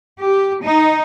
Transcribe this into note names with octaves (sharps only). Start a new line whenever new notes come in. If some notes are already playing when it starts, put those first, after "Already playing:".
G4
D#4